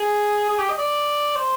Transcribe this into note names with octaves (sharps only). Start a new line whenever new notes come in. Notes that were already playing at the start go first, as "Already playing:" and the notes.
Already playing: G#4
G#4
G4
D#5
D5
C5